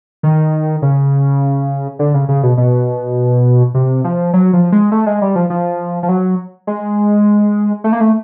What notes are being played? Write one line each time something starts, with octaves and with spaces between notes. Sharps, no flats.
D#3
C#3
D3
C#3
C#3
B2
B2
C3
F3
F#3
F3
G#3
A3
G#3
G3
F3
F3
F3
F#3
G#3
A3
A#3
A3